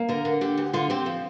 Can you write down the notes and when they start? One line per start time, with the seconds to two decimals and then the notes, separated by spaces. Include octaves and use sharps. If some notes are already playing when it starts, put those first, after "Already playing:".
Already playing: A#3
0.09 D3 A#4
0.25 D3
0.41 D3 G4
0.57 D2
0.73 D3 F4
0.90 C4 G4
1.06 F3